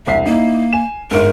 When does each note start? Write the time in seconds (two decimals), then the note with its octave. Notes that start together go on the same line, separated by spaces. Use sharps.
0.06 E1 C2 E5 C7
0.26 A#3 D#4 E4
0.73 G#5 E7
1.11 G1 G#2 A#4